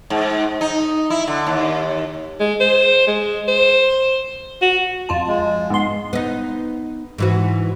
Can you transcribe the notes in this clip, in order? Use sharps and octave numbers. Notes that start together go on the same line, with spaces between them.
G#2
D#4
E4
D3
D#2
G#3
C5
G#3
C5
F#4
F2 F4 A5
G#3
G#2 B3 C6
B3 D#4
G#2 E3 F#4